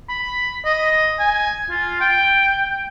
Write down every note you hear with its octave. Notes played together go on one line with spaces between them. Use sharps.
B5
D#5
G#5
F4
G5